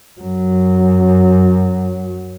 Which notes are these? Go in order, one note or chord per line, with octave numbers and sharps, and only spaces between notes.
F#2 F#3